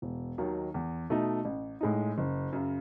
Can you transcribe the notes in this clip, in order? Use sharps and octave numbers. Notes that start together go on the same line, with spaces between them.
E1
D#2 D#3 F#3
E2
B2 A3 D#4
A1
A2 G#3 D#4
F#1
F#2 C#3